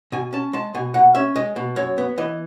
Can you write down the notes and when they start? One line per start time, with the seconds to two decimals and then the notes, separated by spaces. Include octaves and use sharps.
0.12 B2 G#5
0.33 C#4 A5
0.53 G#3 A5
0.75 B2 G#5
0.94 B2 F#5
1.15 C#4 E5
1.36 G#3 D#5
1.56 B2
1.76 F#2 C#5
1.98 B3
2.18 E3 D#5